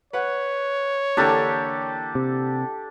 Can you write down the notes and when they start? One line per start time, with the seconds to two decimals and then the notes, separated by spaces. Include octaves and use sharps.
0.13 B4 C#5 F#5
1.17 D3 E3 A#3 D4 G4 A4
2.15 C3